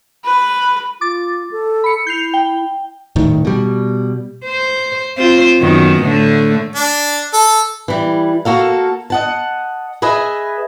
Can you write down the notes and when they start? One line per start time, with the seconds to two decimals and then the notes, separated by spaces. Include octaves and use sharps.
0.25 B4
1.01 F4 D6 A6
1.51 A4
1.84 B5 C#7
2.07 E4 G6 C7 F7
2.34 G5
3.16 D#1 A2 D#3
3.45 B2 G3
4.45 C5
5.17 C4 F4 C5
5.60 F#2 D#3 B3
6.01 A2 D3 A3
6.76 D4
7.34 A4
7.88 E3 G3
8.45 A#3 F#4 A4 F5
9.10 D#5 F#5 A5
10.02 G#4 B4 D#5 E5 G#5